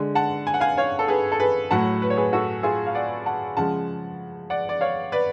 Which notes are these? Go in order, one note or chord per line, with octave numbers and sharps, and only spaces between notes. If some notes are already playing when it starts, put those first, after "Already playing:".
Already playing: D3 G#3
F#5 A5
G#5
F#5
F5 G#5
C#5 F5
A4
G#4 B4
A4
G#4 B4
A2 F#3 A3 F#5 A5
B4
C#5
G#4 B4
F#4 A4
F4 G#4
F5
D5 F#5
F#5 A5
C#3 F3 G#3 F#5 A5
D5 F#5
D5
C#5 F5
B4 D5